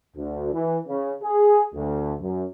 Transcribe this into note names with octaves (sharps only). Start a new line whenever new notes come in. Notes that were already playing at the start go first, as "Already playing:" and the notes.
D2
E3
C#3
G#4
D2
F#2